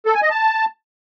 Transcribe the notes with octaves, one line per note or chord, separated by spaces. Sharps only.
A4
G#5
D#5
A5